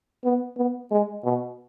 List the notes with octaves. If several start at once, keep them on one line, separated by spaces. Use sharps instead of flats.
B3
B3
G#3
B2